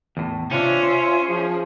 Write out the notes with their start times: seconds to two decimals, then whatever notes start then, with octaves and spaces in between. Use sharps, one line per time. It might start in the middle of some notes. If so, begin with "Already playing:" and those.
0.17 E2 A2
0.51 C3 C#4 D4 F4 E5
0.83 C5
1.29 F3 G#4